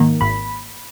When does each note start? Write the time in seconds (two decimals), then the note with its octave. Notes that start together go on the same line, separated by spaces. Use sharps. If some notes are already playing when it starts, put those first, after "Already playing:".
Already playing: G#2 D#3 A#3
0.21 G#1 B5